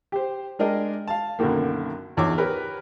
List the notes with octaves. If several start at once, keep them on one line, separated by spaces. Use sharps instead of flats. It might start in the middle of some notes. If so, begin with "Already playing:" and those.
G4 C5
G#3 D4 A#4 D#5 G5
F5 A5
B1 F#2 D3 D#3 A#3
A#1 E2 D#4 C#5 D6
G4 A#4 B4 C#5 G5